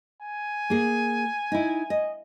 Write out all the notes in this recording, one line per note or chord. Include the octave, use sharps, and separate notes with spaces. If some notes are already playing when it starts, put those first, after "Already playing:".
G#5
A#3 G#4
D#4 E4
D#5